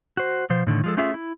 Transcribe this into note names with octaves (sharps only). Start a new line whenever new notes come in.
F#4 C5
B2 F3 C5
A2 D3 D#3
F3 G#3 A4
A3 C#4 F4 G#4 E5
E4